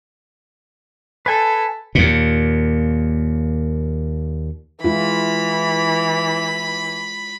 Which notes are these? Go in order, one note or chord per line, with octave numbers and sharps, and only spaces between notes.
A4 B4 G#5
D#2 A#2
E3 G#3 E4 F4 B5